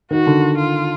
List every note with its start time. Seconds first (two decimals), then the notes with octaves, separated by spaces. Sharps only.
0.11 D#3 F#4
0.27 D3
0.58 F4